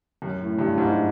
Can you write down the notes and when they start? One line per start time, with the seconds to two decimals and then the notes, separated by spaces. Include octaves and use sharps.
0.22 F#2
0.41 A2
0.59 G2
0.73 G2
0.78 G#2